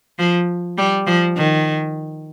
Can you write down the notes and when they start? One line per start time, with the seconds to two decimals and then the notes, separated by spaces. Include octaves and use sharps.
0.19 F3
0.78 G3
1.07 F3
1.37 D#3